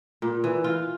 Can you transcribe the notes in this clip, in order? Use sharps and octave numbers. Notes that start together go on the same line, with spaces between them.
A#2
E3
F4